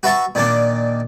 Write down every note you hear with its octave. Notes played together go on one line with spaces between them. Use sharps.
F#4 B4 E5 A5 C#6
A#2 D#3 A#3 D4